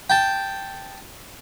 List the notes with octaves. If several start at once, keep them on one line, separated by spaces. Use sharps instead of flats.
G5 A5